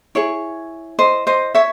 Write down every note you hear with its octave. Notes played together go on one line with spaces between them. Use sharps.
E4 G#4 C#5
C5 D#5
C5 D#5
C#5 E5